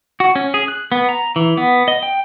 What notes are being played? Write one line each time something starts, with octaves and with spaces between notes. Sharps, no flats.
F#4
C#4
G#4
F#6
B3
A#5
E3
B3
D#5
G5